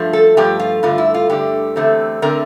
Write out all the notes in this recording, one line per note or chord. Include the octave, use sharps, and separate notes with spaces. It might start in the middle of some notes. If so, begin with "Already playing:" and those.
Already playing: G2 F3 A3
A4
G2 F3 A3 G4
F4
G2 D3 A3 F4
E4
F4
G2 D3 A3 G4
E2 D3 A3 C4
D3 A3 C4 A#4